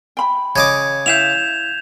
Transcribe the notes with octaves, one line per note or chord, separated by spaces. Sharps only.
G5 B5
C#3 D#5 D6 G#6
E4 E5 F5 G6 E7 F7